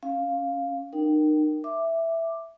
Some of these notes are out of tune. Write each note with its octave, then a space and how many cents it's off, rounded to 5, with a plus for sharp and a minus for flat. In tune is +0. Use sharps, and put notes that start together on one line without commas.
C#4 +0 F5 +0
D#4 -35 A#4 +0 G5 -10
E5 +0 D6 +5